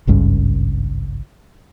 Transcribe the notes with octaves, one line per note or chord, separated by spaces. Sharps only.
G#1 C#2 G2 C#3